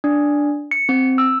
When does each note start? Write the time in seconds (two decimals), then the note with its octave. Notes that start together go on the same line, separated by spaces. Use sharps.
0.04 D4
0.71 C#7
0.89 C4
1.18 E6